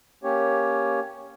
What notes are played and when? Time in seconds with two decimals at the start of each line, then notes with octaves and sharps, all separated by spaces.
0.24 A#3 C#4 G4 C#5